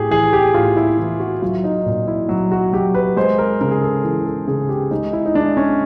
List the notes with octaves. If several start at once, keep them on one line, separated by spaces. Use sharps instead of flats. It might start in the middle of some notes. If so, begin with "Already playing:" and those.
Already playing: A2 G4 G#4
E3 G#4
G4
A2 F4
E4
E3
F#4
F#3 F4
D#4
A#2
E4
F#3
F#4
F#3 G4
B4
G#3 C5
A#4
C#3 A#4
G#4
A4
E3
A4
C#3 G#4
G4
G#3 D#4
E4
D#4
G#3 D4
C#4